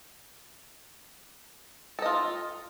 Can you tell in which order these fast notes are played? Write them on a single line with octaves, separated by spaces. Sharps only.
A4 D#5 F4